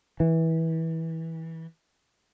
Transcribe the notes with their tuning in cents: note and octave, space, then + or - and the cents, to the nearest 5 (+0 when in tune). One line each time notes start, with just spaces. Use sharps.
E3 -20